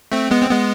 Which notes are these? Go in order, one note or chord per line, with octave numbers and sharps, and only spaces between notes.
A3 C4
G#3 B3
C4
G#3 B3